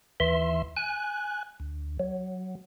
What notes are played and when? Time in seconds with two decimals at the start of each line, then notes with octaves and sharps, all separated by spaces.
0.20 D#2 E3 E5 C6
0.77 G#5 F#6
1.60 D2
2.00 F#3